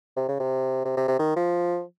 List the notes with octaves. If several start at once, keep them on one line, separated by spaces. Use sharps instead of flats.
C3
C#3
C3
C3
C3
C3
D#3
F3